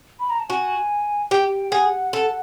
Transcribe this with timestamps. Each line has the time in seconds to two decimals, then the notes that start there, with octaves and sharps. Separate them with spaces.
0.20 B5
0.30 A#5
0.40 A5
0.49 F#4 G#5
1.31 G4 G5
1.72 G#4 F#5
2.13 A4